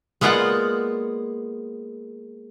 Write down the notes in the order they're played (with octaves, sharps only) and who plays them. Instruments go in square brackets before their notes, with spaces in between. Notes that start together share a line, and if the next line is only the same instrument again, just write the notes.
[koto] G#3 A#3 B3 F4 D5 F#5